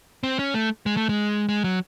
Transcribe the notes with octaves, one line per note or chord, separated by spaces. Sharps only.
C4
C#4
A3
G#3
A3
G#3
G#3
F#3